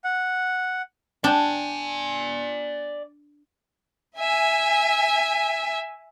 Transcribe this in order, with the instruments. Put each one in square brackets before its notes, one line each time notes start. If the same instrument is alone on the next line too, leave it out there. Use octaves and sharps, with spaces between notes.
[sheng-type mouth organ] F#5
[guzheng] D4 G5 [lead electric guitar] D5 G#5
[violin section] E5 G#5